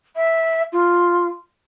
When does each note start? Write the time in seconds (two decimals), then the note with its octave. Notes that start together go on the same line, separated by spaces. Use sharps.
0.16 E5
0.72 F4